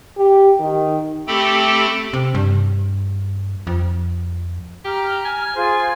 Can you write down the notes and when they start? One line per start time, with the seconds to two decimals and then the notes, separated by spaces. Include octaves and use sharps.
0.17 G4
0.60 D#3
1.27 A3 C4 G4 A4 G5 B5
2.13 C3
2.34 G2
3.67 F2
4.85 G4 A#5 F6
5.25 G#5
5.45 G#6
5.56 F4 G#4 C5